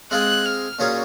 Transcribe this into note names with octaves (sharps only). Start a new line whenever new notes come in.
G#3 C4 F4 G#4 F#6
F6
A#2 F#3 C#4 F4 G#4